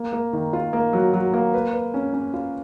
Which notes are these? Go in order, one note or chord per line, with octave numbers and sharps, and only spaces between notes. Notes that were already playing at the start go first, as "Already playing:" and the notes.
Already playing: A#3
A#3
D#3
F4
A#3
F#3
F#3
A#3
B4
B4
C#4
C#4
F4